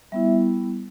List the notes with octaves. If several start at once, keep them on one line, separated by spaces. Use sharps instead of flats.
G3 B3 E4 E5